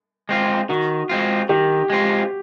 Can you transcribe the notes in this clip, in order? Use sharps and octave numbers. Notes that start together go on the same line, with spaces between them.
G#3 C4 F4
D#3 F#4
G#3 C4 F4
D#3 G4
G#3 C4 F4